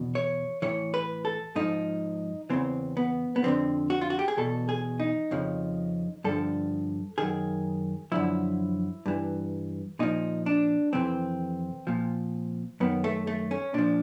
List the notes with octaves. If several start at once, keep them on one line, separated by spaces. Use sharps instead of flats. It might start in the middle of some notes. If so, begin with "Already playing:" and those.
Already playing: E2 B2
C#5
A2 E3 C#5
B4
A4
G#2 F3 D#4
E2 C#3 E3 C4
B3
B3
F2 D3 F3 C4
F#4
F4
F#4
G4
G#4
E2 B2 A4
G#4
D#4
F2 C#3 F3
G2 D3 F3 A4
F#2 D#3 G#4
F#2 D3 F3 E4
G2 E3
A#2 F3 D#4
D4
F2 C3 E3 C4
A#2 F3
F#2 D#3 B3
A3
A3
C#4
A#2 F3 D4